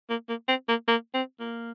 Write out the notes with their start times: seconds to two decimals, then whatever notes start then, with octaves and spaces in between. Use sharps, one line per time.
0.10 A#3
0.29 A#3
0.48 C4
0.69 A#3
0.88 A#3
1.14 C4
1.40 A#3